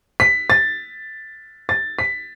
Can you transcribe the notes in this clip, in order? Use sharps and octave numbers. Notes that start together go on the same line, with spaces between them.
B6
A6
A6
B6